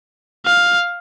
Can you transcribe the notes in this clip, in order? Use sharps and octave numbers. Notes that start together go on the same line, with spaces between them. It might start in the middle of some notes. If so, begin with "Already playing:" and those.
F5